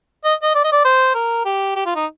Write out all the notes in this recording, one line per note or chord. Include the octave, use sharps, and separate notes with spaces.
D#5
D#5
D5
D#5
D5
C5
A#4
G4
G4
F4
D#4